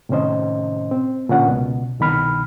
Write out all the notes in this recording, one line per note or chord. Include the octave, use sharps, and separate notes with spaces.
A2 C3 D#3 C#4 C5 D#5
C4
A#2 D3 C#4 F#5
C#2 B2
C2 B2 D#3 B5 F6